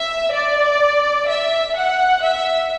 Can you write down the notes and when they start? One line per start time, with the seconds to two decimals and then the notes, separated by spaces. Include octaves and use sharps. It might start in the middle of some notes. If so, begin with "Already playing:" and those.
Already playing: E5
0.32 D5
1.27 E5
1.75 F#5
2.23 E5